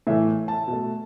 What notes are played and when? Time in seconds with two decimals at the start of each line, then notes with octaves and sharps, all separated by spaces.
0.07 A2 E3 A3 E5
0.48 A5
0.68 B2 A3